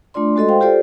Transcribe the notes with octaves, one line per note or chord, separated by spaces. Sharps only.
A3 D4 F4 D5 C6
G#3 F#4 A4 D#5 C6
C5 F5 G5
F4 G4 A4 C5 D5